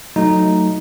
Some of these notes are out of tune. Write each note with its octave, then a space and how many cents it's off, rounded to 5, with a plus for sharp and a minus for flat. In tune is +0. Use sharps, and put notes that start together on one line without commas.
F#3 +0 A3 +5 D#4 +0